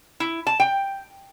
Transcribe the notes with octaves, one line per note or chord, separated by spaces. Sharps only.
E4
A5
G5